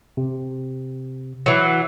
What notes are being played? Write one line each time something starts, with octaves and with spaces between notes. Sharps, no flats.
C3
E3 F#3